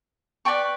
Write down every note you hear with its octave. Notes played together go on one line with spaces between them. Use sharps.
B4 D5 G5 C#6